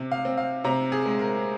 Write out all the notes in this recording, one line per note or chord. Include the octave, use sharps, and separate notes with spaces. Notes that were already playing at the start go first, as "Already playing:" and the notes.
Already playing: C3
F5
C4
F5
C3 A#5
G#4
G#3
A#4